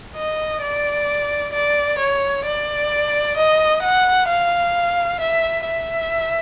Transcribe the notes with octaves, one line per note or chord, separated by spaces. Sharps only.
D#5
D5
D5
C#5
D5
D#5
F#5
F5
E5
E5